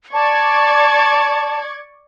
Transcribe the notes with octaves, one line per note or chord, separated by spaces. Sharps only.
D5 A5 C#6 G#6